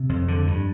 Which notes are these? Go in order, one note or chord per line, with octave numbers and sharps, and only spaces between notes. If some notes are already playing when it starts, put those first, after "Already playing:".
Already playing: C3
F2
D3
G2